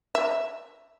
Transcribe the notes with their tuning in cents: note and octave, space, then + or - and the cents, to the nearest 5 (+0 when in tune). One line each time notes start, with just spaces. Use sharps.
E5 +0